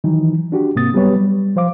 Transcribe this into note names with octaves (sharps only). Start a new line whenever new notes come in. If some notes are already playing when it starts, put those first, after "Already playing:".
D#3 E3 F#3 D#4
D4 F#4 G4
G#2 C3 A#3 C4 D#6 A6
F#3 G3 B3 G4 B4 C#5
G3
F3 C5 F5 D6